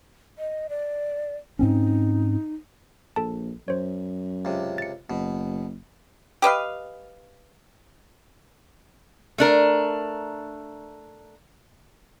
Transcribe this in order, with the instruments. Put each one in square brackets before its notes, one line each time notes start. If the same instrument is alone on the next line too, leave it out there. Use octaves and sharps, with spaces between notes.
[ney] D#5
D5
[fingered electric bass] G#2 C4 C#4 [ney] D#4
[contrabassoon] A#1 [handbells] A4 A5
[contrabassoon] F#2 [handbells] C5 C#5
[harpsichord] C#2 C3
[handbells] A6 C#7
[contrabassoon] F#1 [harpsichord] B2
[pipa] G4 B4 D#5 F5
[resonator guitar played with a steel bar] A3 D4 A#4